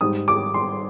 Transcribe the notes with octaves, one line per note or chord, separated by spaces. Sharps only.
G#2 G3 D#6
D6
C6